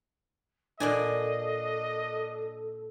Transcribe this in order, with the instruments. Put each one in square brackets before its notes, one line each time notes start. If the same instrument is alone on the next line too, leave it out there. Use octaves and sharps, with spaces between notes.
[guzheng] A#2 D5 G#5 [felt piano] D4 [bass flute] A4 [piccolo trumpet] D#5